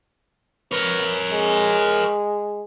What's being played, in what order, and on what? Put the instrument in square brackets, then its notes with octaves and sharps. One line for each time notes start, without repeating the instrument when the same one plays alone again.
[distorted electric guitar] A#4 C#5 [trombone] B4
[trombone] G#3